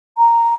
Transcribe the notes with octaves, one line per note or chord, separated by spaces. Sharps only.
A#5